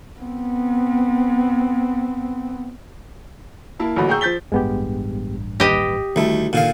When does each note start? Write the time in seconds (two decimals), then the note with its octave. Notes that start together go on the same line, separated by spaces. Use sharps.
0.20 B3 C4
3.80 A#3 E4 A5
3.96 A1 A#2 D3 F#3 F#4 B5
4.09 G#4 G5 A#5 C#6 E6 G6
4.21 F3 C5 G6 A6 B6 G7
4.52 A1 G2 G#3 B3 G4
5.60 D#2 G3 G4 B4 D#5
6.16 D2 D#3 G3 A3 D#4 E4 A4
6.53 A#2 D3 D#3 F5